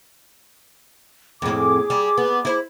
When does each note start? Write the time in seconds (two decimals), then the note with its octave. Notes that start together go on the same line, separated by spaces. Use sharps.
1.42 F2 A2 G#4 D6
1.90 G3
2.18 B3
2.45 E4 C5